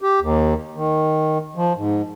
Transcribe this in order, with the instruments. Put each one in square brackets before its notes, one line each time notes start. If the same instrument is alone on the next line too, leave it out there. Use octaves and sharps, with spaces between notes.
[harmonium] G4
D#2
D#3
F3
G#2